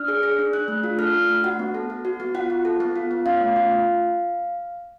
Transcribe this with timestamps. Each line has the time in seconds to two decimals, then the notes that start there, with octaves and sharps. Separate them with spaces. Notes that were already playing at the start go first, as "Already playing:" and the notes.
Already playing: D4 F6
0.08 G#4
0.23 G#4
0.39 D4
0.53 D4 F#6
0.68 A3
0.84 F4
0.99 A4 F6
1.14 D4
1.29 A3
1.44 F#4 F#5
1.59 B3
1.75 A4
1.90 B3
2.05 F#4
2.20 B3
2.35 F4 F#5
2.50 B3
2.65 A4
2.80 B3
2.96 F4
3.11 B3
3.26 C#4 F5
3.41 A3
3.56 F4